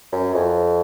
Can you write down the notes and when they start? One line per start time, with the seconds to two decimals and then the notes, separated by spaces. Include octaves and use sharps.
0.12 F#2
0.34 F2